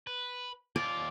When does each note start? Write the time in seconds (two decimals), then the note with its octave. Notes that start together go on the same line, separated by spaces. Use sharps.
0.07 B4
0.76 D#2 F4 D5